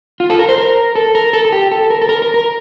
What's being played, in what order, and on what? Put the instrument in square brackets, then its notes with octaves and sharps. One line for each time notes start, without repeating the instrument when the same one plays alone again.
[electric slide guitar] F4
A4
A#4
C5
A#4
A4
A#4
A4
A4
G4
A4
A#4
A4
A#4
A#4
A#4